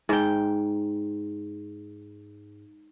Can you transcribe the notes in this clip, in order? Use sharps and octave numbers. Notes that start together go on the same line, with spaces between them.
G#2 G5